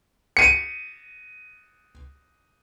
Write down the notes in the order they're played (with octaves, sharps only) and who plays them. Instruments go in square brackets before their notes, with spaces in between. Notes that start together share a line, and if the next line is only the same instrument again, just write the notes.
[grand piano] C#7 D#7